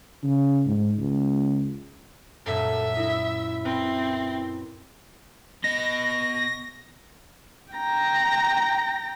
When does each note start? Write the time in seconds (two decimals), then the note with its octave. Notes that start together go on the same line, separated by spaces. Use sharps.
0.23 C#3
0.66 G#2
0.98 C#2
2.46 F#2 A#2 A4 E5
2.97 D#4 E4
3.65 C4 A#4 B4 B5
5.64 B3 D#5 A#6
7.73 G5 A#5